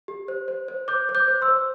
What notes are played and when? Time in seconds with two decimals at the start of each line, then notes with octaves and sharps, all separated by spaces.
0.08 G4
0.28 C5
0.48 C5
0.68 C5
0.88 C5 D6 G6
1.09 C5
1.15 D6 G6
1.28 C5
1.42 C6 E6
1.48 C5